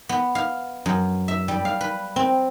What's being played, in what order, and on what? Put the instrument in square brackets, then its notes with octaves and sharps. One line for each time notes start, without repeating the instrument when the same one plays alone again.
[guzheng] B3
F5
F#2
E5
G3
F5
B4
C4